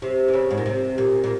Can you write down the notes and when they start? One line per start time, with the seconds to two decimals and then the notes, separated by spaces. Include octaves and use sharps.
0.02 C3
0.28 E3
0.33 C#3
0.51 G#2
0.57 A#2
0.66 C3
0.98 A#2
1.24 A#2